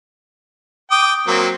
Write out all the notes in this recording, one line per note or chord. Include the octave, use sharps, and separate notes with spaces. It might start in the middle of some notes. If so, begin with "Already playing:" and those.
G5 D6 D#6
F#3 A#3 C4